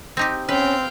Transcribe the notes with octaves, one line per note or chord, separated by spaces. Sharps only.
C4 D#4 G4
C4 C#4 B4 F5 G5